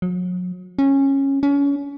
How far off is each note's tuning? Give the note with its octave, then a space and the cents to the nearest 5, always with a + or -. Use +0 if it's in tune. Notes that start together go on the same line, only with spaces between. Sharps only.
F#3 -40
C#4 -15
C#4 +30